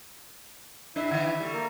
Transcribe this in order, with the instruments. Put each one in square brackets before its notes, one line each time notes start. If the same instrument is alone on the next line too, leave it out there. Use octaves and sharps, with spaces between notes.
[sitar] G2 D4 B4 [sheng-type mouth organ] E4 E5
[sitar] D3 E3
G3 A3
[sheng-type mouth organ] A#3 A#4